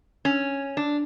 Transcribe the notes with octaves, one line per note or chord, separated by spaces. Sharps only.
C#4
D4